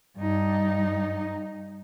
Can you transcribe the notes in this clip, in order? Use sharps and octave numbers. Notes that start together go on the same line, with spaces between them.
G2 D#4